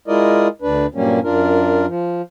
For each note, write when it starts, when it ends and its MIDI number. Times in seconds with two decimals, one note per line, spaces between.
0.08 0.48 56
0.08 0.48 64
0.08 0.48 65
0.08 0.48 70
0.08 0.48 74
0.08 0.48 75
0.62 0.86 38
0.62 0.86 62
0.62 0.86 71
0.95 1.20 43
0.95 1.20 46
0.95 1.20 54
0.95 1.20 55
0.95 1.20 58
0.95 1.20 61
1.23 1.86 42
1.23 1.86 62
1.23 1.86 65
1.23 1.86 70
1.88 2.22 53